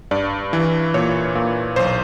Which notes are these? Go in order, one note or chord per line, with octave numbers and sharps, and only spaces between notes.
G2 D5
E3
A#2 C#5
A#2
B1 C5